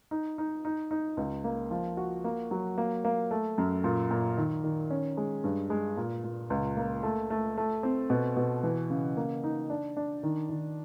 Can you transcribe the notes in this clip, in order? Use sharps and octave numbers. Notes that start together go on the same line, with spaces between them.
D#4
D#4
D#4
D#4
C#2
A#3
F3
F#4
A#3
F#3
A#3
A#3
A3
F#2
A#2
A#2
D#3
D#3
C#4
G#3
G2
G#3
A#2
A#2
C#2
A#3
A3
A3
A3
C4
B2
B2
E3
C#3
A#3
D#4
D4
D4
D#3
D#3